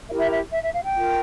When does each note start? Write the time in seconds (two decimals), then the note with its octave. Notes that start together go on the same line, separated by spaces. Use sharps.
0.10 E4 G4 A#4 E5
0.20 E5
0.32 E5
0.52 E5
0.63 E5
0.74 F5
0.85 G5
0.95 F4 A#4